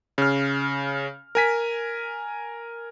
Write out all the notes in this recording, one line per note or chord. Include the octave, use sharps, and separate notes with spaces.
C#3 F6
A#4 G#5 B6